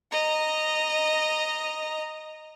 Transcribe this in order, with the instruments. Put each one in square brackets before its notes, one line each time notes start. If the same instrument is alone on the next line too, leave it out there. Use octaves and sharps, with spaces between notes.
[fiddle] D#5 A#5